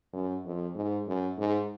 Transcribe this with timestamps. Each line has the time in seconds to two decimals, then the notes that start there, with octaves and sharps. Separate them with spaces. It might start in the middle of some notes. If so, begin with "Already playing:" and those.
0.13 F#2
0.45 F2
0.76 G#2
1.07 F#2
1.38 G#2